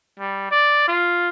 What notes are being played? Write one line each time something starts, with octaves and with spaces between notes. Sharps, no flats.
G3
D5
F4